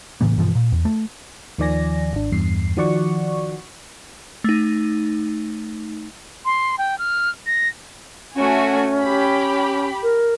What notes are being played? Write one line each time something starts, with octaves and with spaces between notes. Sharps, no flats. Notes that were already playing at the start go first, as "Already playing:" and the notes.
A2 C#3 E3 A#3
G2 B2 E3 F3
A#2
E2
A3
D#2 D#3 F3 D5 G#5 A#6
G#1 D4
E2 G2 C7
D#3 F3 F#4 D5 F#5 C#6
A3 D#4
C6
G5
F6
A#6
A3 C#4 F#4 G#5
G4 B5
A#4